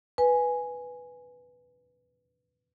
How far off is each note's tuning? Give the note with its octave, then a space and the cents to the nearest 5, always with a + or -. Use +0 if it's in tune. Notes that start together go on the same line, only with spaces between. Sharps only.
B4 +0 G#5 +0